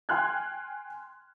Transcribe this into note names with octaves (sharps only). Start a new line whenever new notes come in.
G5 G#5 C6 F6 F#6 G#6